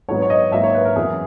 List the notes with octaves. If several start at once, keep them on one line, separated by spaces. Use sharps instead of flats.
G#2 F#3 B3 C#5
C#5
D#5
G#2 F#3 A#3 E5
C#5
B4
A#4
F#2 E3 B3 G#4